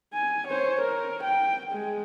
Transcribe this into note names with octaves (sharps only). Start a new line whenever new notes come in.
G#5
C5 C#5
A#4
G5
G#3